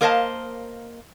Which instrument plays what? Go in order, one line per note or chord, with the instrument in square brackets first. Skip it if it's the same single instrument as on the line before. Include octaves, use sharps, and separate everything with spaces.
[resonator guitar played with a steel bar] A#3 A#4 C5 D#5 F5 A5